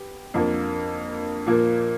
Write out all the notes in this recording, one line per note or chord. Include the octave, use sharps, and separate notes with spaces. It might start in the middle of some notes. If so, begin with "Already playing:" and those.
Already playing: B3 G4
F2 D3 F3 A#3
A#2 F3 A#3